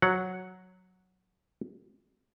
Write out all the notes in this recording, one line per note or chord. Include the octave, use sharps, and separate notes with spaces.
F#3 F#5